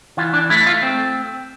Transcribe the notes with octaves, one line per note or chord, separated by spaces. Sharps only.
E3 F4
D4
A3 E4
F4
C4